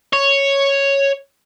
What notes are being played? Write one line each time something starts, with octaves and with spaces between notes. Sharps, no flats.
C#5